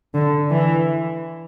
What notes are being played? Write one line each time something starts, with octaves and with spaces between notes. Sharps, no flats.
D3
E3